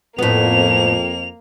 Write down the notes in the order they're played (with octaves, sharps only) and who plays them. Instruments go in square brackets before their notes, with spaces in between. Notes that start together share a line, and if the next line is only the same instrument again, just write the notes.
[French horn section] F2 [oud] A2 B3 [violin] A#3 F7